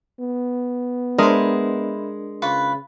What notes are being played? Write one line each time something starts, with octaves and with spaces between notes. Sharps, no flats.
B3
G#3 D4 E4 A#4 C5 D#5
C#3 F4 B4 C#6